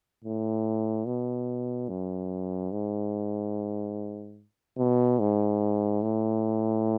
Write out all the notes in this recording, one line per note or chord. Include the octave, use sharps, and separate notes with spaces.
A2
B2
F#2
G#2
B2
G#2
A2